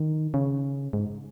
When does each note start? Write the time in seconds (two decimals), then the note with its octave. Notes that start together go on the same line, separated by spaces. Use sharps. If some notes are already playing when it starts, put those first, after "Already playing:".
Already playing: D#3
0.34 C#3
0.93 G#2